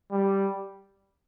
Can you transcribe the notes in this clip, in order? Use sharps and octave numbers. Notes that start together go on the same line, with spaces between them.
G3